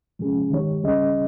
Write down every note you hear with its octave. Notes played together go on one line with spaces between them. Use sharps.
C3 F3 G#3 C#4 G#4
D#3 G#3 D#4 G4 C#5
C#3 G3 C#4 G#4 D#5